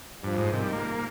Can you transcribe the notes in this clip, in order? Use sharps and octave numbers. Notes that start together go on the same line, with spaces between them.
G2 F3
G#2
C3 D#3
G3
A#3